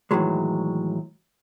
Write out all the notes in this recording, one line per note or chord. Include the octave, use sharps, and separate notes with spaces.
A2 D#3 E3 F#3 G#3